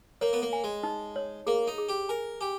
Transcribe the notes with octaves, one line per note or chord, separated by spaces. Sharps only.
A#3 C#5
B3
A#3
G#5
G#3
D#4
C#5
A#3 G#4
D#4
G#4
G4
A#4 G#5
G4 G#5